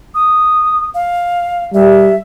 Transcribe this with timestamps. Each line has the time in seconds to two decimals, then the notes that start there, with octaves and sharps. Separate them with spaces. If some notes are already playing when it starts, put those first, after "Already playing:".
0.15 D#6
0.94 F5
1.74 G3 E5